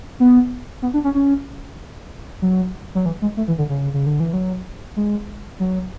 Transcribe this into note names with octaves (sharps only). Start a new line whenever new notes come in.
B3
B3
D4
C#4
C#4
F#3
F#3
E3
G#3
A3
E3
D3
C#3
C#3
D3
E3
F#3
G#3
F#3